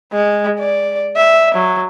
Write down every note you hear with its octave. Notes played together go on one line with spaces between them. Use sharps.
G#3
D5
E5
F#3